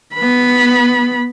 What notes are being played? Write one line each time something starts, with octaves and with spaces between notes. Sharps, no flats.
B3 B5